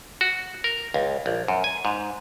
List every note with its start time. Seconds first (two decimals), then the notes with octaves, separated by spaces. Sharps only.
0.21 F#4
0.64 A#4
0.94 C#2
1.26 A#1
1.48 F#2
1.64 G#5
1.85 G#2